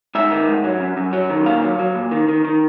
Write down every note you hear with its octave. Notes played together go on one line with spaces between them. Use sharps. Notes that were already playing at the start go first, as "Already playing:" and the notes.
G#2 E5
D#3
G#2
F#3
F#2
F#2
F#3
D#3
A#2 F5
F#3
F#3
A#2
D#3
D#3
D#3